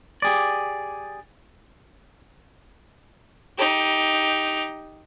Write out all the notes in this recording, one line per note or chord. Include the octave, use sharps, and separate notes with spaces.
G4 G#4 D5
D#4 G4